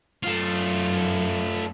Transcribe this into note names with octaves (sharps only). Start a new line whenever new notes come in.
F#2 A3 F4